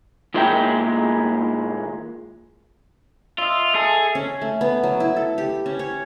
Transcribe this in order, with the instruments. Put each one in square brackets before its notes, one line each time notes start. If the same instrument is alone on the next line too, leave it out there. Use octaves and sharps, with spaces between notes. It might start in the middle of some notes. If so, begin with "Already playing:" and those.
[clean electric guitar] D#2 A#2 G#3 E4 F4 G5
[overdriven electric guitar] F4 [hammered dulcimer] D#5 E5
[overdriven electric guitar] G#4 [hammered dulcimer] A4
[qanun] C#4
A3
B3
F#3
E4
A4
G4
C#4
C#5